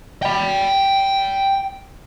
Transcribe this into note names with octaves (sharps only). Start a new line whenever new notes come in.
G5 B5